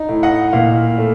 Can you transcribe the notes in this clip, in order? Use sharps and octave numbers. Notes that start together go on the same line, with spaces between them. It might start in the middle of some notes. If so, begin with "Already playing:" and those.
Already playing: D#4
A2
D#5 F#5
A#2 F5
A3